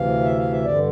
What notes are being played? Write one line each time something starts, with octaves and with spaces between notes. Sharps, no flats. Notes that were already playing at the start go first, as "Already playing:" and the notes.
Already playing: D2 C3 E3 F5
E5
F5
E5
G2 D3 D5